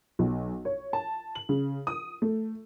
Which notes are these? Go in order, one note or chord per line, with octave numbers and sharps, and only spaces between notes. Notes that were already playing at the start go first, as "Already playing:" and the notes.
B1
C#5
A5
F#7
C#3
D#6
A3